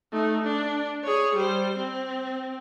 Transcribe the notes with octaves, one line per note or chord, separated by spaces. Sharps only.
A3 D#4
D4
G#4 C#5
G3 C5
C4